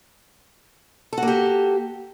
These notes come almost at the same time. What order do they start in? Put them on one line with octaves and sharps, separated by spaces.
A4 F#4 A#3 G4